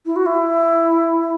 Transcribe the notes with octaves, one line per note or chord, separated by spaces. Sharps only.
E4
F#4
E4